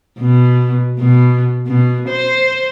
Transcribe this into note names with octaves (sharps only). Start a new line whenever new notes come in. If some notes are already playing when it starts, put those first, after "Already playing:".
B2
B2
B2
C5